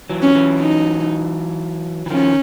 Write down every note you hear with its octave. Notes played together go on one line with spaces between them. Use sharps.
E3 F#3
C#4
E3 F#3
D#4
E3
D#3 F3 C#4